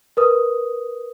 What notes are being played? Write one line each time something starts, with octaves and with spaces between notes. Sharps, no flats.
A#4 B4 D#6